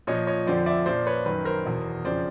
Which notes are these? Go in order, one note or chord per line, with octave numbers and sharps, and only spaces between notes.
A#2 F3 C#5 D#5
C#5 D#5
F2 D3 F3 C5 D5
D5 E5
A#2 F3 C5 D5
B4 C#5
F#2 D#3 B4
A#4 C5
E2 B2
F2 C#3 F3 C5 D5